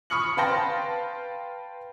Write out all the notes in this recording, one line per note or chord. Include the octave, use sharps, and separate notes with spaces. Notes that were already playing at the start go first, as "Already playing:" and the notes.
B5 C#6 D#6 F6 C#7 F#7
B4 F5 G5 A5 C6 A#6